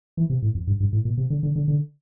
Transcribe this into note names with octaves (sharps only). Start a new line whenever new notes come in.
E3
C3
A2
F2
G2
G2
A2
A#2
C3
D3
D3
D3
D3